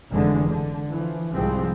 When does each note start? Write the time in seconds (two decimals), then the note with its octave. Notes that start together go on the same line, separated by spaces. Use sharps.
0.11 F1 D3 E3 G#3
0.47 D3
0.90 E3 F3
1.33 C2 G#2 F3 G#3 C4